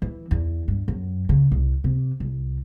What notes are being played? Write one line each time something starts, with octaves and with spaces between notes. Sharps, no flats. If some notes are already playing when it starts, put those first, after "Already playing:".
E3
E2
G2
F#2
C#3
C2
C3
C2